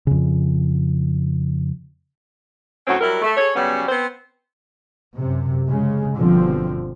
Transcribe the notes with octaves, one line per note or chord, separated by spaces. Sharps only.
F2 C#3
D2 A2 F#3 C4 C#4
F#3 G3 E4 A#4
A3
G#4 A4 C#5
C#3 F#3 G3 B3 C#4
B3 C4 C5
F#2 C3
C#3 G#3
G1 B2 D3 F3 C4